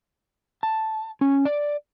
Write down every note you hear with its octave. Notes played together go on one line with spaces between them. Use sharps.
A5
C#4
D5